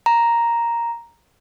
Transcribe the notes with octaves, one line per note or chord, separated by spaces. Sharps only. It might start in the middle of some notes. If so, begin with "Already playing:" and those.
A#5